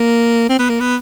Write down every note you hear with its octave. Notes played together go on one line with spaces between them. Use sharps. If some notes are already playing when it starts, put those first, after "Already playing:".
Already playing: A#3
C4
B3
A#3
B3